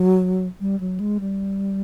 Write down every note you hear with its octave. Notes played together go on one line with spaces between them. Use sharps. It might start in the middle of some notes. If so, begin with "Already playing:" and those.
Already playing: F#3
G3
F#3
G#3
G3